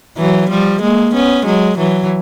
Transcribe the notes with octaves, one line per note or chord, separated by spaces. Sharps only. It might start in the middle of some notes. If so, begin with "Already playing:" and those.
E3 F#3
F3 G3
G#3 A#3
B3 C#4
F#3 G#3
E3 F#3